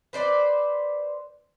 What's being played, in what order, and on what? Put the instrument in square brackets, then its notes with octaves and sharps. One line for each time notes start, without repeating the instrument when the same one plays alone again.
[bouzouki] B4 C5 D5